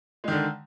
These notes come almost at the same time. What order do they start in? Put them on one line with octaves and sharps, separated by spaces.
G#3 D#3 D3